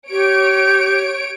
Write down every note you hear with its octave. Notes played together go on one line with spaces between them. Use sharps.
G4 C#5 D7